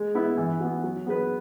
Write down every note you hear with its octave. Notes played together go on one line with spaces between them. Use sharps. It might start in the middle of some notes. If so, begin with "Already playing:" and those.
Already playing: G#3
B3 E4
E3
B3 F#4
F#3
B3 G#4 B4